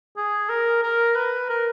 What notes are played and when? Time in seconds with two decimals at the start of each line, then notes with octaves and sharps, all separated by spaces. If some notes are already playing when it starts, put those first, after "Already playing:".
0.17 G#4
0.49 A#4
0.83 A#4
1.15 B4
1.49 A#4